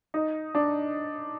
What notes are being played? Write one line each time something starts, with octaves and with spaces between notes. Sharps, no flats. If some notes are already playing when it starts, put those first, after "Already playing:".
D#4
D4